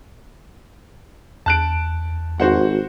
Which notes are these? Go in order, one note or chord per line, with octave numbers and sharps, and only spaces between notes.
E2 A5 F#6 D7
G#1 F#4 C5 F#5